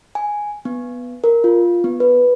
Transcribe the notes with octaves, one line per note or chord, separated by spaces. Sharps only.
G#5
B3
A#4
F4
B3
B4